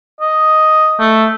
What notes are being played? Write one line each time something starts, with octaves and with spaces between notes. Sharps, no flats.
D#5
A3